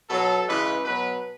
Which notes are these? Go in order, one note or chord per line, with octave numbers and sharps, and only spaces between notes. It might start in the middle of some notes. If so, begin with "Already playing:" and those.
B2 F#3 A4
C#3 E3 G#3 B4
B2 F#3 B4